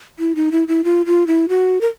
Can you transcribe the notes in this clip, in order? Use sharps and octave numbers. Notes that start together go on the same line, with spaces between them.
E4
D#4
E4
E4
F4
F4
E4
F#4
A#4